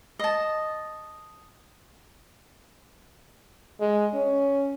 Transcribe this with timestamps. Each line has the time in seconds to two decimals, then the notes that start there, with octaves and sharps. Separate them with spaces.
0.19 D#5 A5
3.80 G#3
4.14 C#4